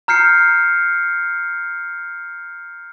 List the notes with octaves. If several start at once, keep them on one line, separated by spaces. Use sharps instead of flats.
A#5 F6 G6 C7 C#7